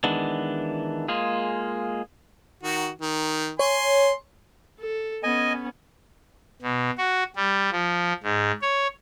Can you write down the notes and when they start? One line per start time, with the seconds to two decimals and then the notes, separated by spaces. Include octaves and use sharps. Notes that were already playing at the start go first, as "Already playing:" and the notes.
0.04 D#3 E3 G#3 B3 D4
1.08 G#3 A#3 F4 G#4
2.63 D#3 F#4
3.01 D#3
3.59 C#5 G#5 C6
4.80 A4
5.23 B3 C#4 D#5 G#5
6.62 B2
6.98 F#4
7.36 G3
7.72 F3
8.23 G#2
8.62 C#5